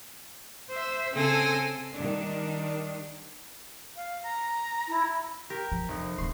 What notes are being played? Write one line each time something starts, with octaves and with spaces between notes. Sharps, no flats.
C5 E5
C#3 C4 A4 G#5 C6 A#6
D#3 G3 D4
F5
A#5
E4
G4 A#4
F3
F1
D1 D#3 C6